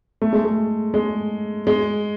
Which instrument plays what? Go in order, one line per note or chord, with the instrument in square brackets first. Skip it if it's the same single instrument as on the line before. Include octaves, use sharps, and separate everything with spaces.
[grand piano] A3
G#3
A3
G#3
G#3